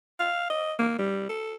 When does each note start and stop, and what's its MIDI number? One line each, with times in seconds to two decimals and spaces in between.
0.19 0.48 77
0.50 0.73 75
0.79 0.95 58
0.98 1.25 55
1.29 1.55 69